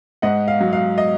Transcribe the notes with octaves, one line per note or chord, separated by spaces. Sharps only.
G#2 D#5 F#5
F5
F#3
F5
D#5